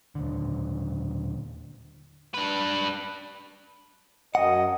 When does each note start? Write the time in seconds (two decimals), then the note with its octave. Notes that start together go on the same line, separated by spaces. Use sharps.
0.15 D#1 D3
2.34 D4 B4
4.35 F#2 D#5 F#5